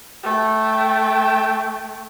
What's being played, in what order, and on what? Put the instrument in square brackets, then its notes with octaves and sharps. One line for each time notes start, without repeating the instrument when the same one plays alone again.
[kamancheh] A3 G5